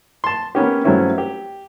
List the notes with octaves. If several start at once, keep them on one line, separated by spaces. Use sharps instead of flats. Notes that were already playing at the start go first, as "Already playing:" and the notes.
A5 C6
A#3 B3 C#4 G4
G2 F#3 A3 C4 C#4 E4
G4